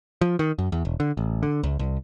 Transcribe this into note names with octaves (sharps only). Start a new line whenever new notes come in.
F3
D#3
F#2
E2
E1
D3
A1
D3
C#2
C2